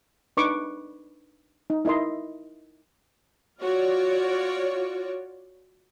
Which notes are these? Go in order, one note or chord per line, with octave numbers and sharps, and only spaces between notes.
D4 D#4 B4 C#6 D6
D#4
D#4 E4 A#4 D#5 E5 C6
F4 F#4 C#5 D5